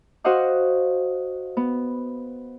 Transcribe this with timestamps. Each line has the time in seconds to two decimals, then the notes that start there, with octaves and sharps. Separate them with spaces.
0.24 F#4 C5 D#5 F5 F#5 D6
1.57 B3